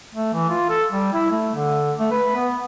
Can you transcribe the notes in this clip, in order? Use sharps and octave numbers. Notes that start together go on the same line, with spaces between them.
A3
E3
F4
A4
G3
E4
A3
D3
A3
B4
B3